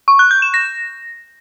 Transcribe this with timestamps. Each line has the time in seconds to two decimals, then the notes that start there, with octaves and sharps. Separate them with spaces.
0.08 C#6
0.19 F#6
0.31 G6
0.42 E7
0.54 A#6